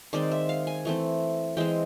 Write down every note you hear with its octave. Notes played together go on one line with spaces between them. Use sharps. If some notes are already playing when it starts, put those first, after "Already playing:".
D#3 G#3 C4 D5
E5
F5
G#5
E3 A3 C4
E3 G#3 C4 G5